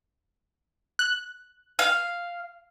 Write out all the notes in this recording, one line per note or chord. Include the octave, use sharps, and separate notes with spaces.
F#6
F5